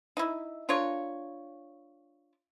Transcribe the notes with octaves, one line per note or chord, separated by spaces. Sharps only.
D#4 E4
D4 F4 A#4 C#5